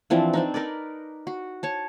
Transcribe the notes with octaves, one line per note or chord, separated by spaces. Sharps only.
E3 F3 C4 D4
C4 D4 D#4
D#4 A#4 B4 D5
F#4
C#5 A5